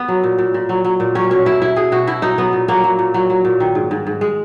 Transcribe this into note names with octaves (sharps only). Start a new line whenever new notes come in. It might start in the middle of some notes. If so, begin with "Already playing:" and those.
Already playing: B3
F#3
A#2
A#2
A#2
F#3
F#3
A#2
F#3 C#4
B2 C#4
B2 E4
B2 E4
B2 G#4
B2 F#4
B2 E4
B2 D#4
F#3 B3
A#2
F#3 A#3
F#3
A#2
F#3
F#3
A#2
D#3
G#2
G#2
G#2
G#3